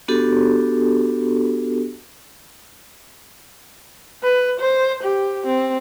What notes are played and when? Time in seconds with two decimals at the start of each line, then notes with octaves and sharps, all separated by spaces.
0.08 B3 D4 F#4 G4 A4
4.23 B4
4.60 C5
5.03 G4
5.47 C4